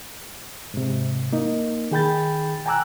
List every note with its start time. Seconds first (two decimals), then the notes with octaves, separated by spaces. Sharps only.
0.74 G#2 C3
1.33 A#3 D#4
1.91 D#3 G#4 G5 B5 G6 A6
2.66 G5 G#5 A#5 D6 E6 F#6